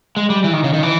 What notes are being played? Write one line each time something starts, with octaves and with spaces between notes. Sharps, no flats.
G#3
G3
E3
D#3
C#3
D#3
E3